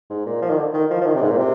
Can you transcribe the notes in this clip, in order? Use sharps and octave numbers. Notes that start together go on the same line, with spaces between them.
G#2
A#2
F3
D#3
D3
D#3
F3
F3
D#3
C3
G#2
A#2
C3